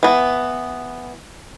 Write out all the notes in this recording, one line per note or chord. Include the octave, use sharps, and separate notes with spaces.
E3 B3